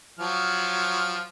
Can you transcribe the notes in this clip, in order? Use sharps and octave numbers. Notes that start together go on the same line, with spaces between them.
F3 F#3 F6